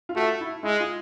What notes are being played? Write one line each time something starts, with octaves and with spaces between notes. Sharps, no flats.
F4
A3 F#4
E4
G#3 E4
F4